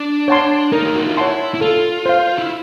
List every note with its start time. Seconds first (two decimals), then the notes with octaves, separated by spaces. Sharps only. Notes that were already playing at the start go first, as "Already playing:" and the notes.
Already playing: D4
0.28 C#5 F#5 A5 C6
0.72 D#4 A#4
0.85 G4
0.96 F#4
1.07 F4
1.17 E4 C#5 F#5 A5 C6
1.54 E4
1.61 F4 A4
2.06 C5 F5
2.38 E4